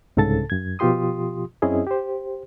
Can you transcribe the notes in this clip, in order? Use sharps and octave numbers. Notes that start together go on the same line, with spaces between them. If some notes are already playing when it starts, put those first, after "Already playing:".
C2 G#2 C#3 A4 A5 A6
F#2 G#6
B2 F3 F4 G4 C6 D#6
F#2 C4 C#4 E4 G#4 D#5
G4 C5